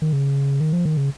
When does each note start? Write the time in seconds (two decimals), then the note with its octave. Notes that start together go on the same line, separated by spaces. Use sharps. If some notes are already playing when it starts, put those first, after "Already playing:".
0.02 D#3
0.13 C#3
0.60 D#3
0.73 F3
0.85 D#3
0.97 C#3